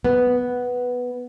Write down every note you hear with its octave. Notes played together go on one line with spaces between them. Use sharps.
B3